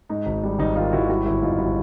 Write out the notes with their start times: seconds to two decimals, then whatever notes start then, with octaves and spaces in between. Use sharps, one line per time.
0.09 G#2 D#4
0.26 G#1
0.43 G3
0.59 G#1 D#4
0.75 D#3 D#4 F4
0.93 G#1 E4 F#4
1.08 G3 E4 F#4
1.25 G1 E4
1.42 F2 D#4 F4
1.58 G3 E4 F#4